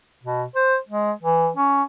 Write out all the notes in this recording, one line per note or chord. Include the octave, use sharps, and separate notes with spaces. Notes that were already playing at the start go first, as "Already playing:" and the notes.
B2
C5
G#3
E3
C#4